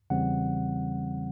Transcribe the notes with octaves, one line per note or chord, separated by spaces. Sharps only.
E2 C#3 E3 G3 C4 F#5